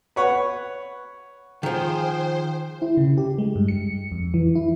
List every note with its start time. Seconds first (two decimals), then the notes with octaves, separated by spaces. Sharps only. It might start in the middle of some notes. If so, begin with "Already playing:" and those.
0.16 B4 C#5 F#5
1.63 D#3 F3 G#4 C5 G5
2.82 E4
2.97 C#3
3.18 G4
3.38 G#3
3.56 G2
3.68 C#7
4.12 F2
4.34 E3
4.55 E4